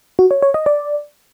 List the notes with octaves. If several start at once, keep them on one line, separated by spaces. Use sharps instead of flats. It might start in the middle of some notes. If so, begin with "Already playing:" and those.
F#4
C#5
C#5
D#5
D5